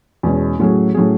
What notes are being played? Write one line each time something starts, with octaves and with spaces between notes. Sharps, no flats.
E2 B2 G#3 C#4
A2 F#3 C#4 G#4
A2 F#3 C#4 G#4